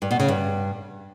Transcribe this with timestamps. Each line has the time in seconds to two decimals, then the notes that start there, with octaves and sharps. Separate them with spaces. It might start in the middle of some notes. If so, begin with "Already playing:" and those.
0.02 G2
0.11 B2
0.20 C#3
0.28 G2